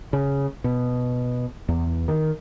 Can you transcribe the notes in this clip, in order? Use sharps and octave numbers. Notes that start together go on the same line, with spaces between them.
C#3
B2
E2
D#3